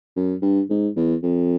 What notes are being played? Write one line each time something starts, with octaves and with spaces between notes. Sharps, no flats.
F#2
G2
G#2
E2
F2